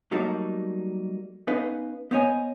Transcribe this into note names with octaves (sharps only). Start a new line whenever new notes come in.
F#3 G3 A3 A#3 D#4 F#4
B3 C#4 D#4 B4 D#5 F5
B3 C5 C#5 D#5 G#5